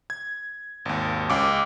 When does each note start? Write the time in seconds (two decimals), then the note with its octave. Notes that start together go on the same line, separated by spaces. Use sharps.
0.10 G#6
0.85 G#1 D#2
1.30 C#2 C#4 D6